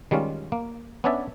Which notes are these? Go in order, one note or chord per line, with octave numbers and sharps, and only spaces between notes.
D#3 G3 G#3 C#4 F4
A#3
B3 C#4 D4 C#5 D5 E5